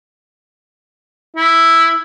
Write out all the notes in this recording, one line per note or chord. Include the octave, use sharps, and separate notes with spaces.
E4